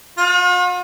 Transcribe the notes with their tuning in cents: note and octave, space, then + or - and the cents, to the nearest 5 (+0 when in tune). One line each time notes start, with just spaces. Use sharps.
F4 +45